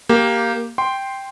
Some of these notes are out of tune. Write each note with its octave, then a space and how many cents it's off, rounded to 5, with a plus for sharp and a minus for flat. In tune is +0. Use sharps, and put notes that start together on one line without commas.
A#3 +0 G4 +0
G5 +0 C6 +0